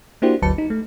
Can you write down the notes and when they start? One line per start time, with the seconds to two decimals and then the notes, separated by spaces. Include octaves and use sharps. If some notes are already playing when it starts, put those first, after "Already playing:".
0.22 A#3 D4 E4 F#4 G4 C5
0.42 G1 D2 F#3 B4 A5 C#7
0.58 D#4
0.70 A3